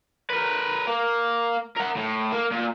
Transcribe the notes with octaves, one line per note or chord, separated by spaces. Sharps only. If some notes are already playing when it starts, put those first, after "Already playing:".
A#4 B4
A#3
A#4 F#5
A2
A#3
A#2